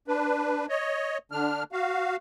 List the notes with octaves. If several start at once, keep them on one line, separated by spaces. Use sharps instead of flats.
D4 B4
C#5 D#5
D3 D4 F6
F#4 F5